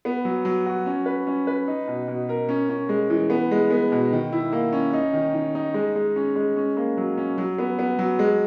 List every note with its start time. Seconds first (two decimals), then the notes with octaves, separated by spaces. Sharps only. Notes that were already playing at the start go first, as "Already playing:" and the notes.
0.05 B3
0.25 F#3
0.45 F#3
0.66 F#4
0.86 C#4
1.06 B4
1.27 C#4
1.47 B4
1.67 D#4
1.88 B2
2.08 B2
2.29 A#4
2.49 C#4
2.69 C#4
2.89 G#3
3.10 E3
3.30 B3
3.51 G#3
3.71 B3
3.92 B2
4.12 D#3
4.32 E4
4.53 A#3
4.73 C#4
4.93 D#4
5.14 D#3
5.35 D#3
5.55 D#4
5.74 G#3
5.95 G#3
6.16 C#4
6.35 G#3
6.56 C#4
6.77 A#3
6.97 F#3
7.18 C#4
7.38 F#3
7.58 B3
7.79 B3
7.99 F#3
8.19 G#3